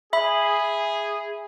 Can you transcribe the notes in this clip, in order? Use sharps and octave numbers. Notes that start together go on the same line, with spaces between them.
G#4 E5 B5